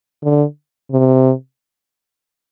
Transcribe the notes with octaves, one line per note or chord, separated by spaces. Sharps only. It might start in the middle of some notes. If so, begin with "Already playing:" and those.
D3
C3